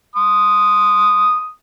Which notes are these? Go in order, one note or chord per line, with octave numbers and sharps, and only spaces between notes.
C6 D#6